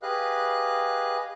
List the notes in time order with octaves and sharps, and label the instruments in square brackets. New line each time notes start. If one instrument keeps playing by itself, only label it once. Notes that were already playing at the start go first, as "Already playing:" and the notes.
[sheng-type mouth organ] G4 G#4 B4 D#5 F5 F#6